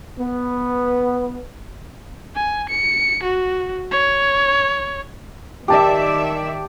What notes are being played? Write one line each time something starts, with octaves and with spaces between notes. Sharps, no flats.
B3
G#5
C#7
F#4
C#5
D#3 G4 D5 E5 A5